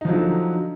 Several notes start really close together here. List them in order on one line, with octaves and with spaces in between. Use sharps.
D#4 F3 F#3 D3